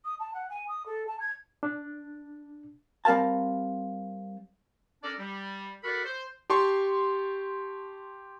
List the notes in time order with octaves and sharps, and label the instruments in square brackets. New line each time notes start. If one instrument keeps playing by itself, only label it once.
[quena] D#6
A5
F#5
G#5
D#6
A4
A5
G#6
[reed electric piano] D4
[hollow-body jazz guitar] G3 C4 A#4 F5 A5
[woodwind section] C#4 D4 A4 A#4 D5
G3
F#4 A4 A#4 D5 F#5 B5
C5
[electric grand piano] G4 A5 C6 C#6